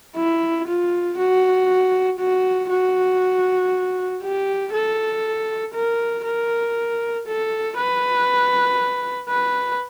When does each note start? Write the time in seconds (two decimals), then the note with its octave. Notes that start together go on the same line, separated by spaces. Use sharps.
0.16 E4
0.67 F4
1.18 F#4
2.19 F#4
2.70 F#4
4.22 G4
4.73 A4
5.74 A#4
6.25 A#4
7.27 A4
7.77 B4
9.29 B4